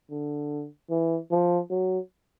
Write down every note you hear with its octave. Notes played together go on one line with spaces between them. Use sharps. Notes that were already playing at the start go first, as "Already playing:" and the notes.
D3
E3
F3
F#3